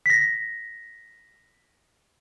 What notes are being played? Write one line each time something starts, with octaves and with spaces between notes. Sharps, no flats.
A#6 B6